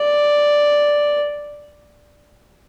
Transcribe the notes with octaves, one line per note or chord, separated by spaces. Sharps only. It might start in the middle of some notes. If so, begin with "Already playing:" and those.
Already playing: D5